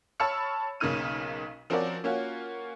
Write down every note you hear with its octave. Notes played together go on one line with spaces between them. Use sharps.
C#5 A5 B5 E6 F6 C#7
B1 C#3 A#3 D#4 F6 D#7
F3 C4 C#4 F#4 A#4 D5
A#3 C#4 F4 F#4